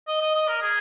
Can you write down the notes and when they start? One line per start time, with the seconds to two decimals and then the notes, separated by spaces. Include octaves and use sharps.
0.08 D#5
0.21 D#5
0.35 D#5
0.48 A#4
0.62 G#4